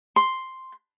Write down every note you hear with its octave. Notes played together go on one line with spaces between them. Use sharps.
C6